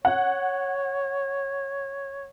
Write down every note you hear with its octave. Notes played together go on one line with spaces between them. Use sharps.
C#5 F#5